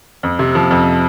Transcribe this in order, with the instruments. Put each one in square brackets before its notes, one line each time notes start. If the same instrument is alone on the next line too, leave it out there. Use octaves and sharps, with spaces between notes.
[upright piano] F2
C3
F3
F2